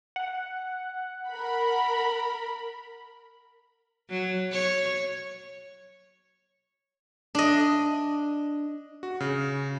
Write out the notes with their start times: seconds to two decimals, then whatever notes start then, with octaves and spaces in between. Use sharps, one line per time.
0.16 F#5
1.29 A#4 B5
4.10 F#3
4.52 C#5
7.35 D4 D#5
9.03 F#4
9.20 C#3